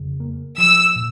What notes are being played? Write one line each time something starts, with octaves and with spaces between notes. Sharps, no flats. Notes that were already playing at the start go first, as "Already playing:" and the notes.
Already playing: F2 C#3
A#3
F3 E6
A#2